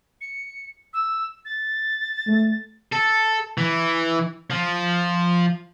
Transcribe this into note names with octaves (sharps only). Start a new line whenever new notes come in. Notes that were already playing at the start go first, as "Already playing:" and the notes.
C#7
E6
A6
A3
A4
E3
F3